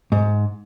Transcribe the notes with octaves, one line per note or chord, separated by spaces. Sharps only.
G#2